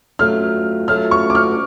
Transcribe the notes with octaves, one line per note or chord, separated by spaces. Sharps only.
F#3 A3 F4 F6
F#3 A3 F4 F6
C#6
D6
F6